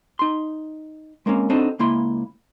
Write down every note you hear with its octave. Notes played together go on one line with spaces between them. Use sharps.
D#4 C6
G#3 A#3 C4 C#4
C4 D4 D#4 F#4 A4 C5
C#2 A#3 E4 C6